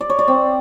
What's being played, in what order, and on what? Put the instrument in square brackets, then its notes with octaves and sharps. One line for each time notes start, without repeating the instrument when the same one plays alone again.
[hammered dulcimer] D5
C#5
D5
C4